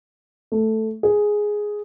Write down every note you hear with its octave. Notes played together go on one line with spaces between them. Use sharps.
A3
G#4